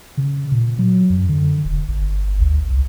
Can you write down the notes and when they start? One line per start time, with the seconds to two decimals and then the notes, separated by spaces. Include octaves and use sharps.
0.17 C#3
0.52 A#2
0.79 F#3
1.10 F#2
1.29 D3
1.65 E1
1.88 G1
2.40 D2
2.69 C2